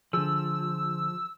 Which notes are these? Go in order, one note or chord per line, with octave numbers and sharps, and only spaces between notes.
D3 F3 G#4 E6